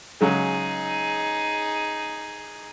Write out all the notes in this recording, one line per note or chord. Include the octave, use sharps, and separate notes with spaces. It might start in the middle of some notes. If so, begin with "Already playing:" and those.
C#3 F#3 G#3 D#4 G#4